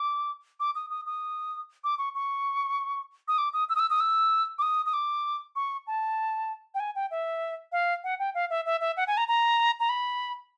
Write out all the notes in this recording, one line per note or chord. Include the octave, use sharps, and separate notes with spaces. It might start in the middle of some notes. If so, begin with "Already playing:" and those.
Already playing: D6
D6
D#6
D#6
D#6
D6
C#6
C#6
D#6
D6
D#6
E6
D#6
E6
D#6
E6
D6
D#6
D#6
D6
C#6
A5
G5
G#5
G5
E5
F5
F#5
G5
F5
E5
E5
E5
F#5
G#5
A#5
A#5
A#5
B5